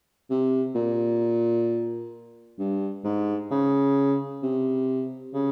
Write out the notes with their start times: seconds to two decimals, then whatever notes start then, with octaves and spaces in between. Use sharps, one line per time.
0.30 C3
0.75 A#2
2.58 G2
3.04 G#2
3.51 C#3
4.43 C3
5.34 C#3